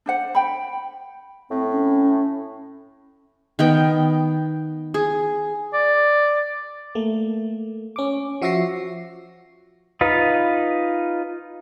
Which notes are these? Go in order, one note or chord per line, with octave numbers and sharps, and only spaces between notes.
D4 C5 F#5
G5 B5
A2 C4
C#4
D#3 B3 G5
G#4
D5
A3 A#3
C#4 D6
F3 F#4 E5 C#6 A#6 C7
D#4 F4 B4